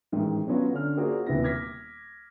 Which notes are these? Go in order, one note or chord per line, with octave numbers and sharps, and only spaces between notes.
A1 G#2 D#3
B2 F#3 B3 C#4 F4 F#4
D3 C#4 F6
A#3 F4 F#4 G#4 C5 D5
D#1 D#2 C3 B3 E4 A#6
D6 F6 G#6 A#6 B6